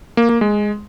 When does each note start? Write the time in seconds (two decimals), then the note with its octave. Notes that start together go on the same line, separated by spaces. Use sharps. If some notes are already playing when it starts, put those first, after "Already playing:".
0.17 A#3
0.29 A#3
0.41 G#3